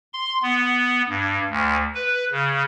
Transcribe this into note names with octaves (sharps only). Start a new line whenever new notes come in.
C6
B3
G2
D2
B4
C#3